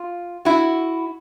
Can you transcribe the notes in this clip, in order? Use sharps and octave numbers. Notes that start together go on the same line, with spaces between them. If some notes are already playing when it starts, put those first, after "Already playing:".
Already playing: F4
E4 F#4